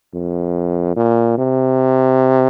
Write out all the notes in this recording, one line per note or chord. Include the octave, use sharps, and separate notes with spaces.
F2
A#2
C3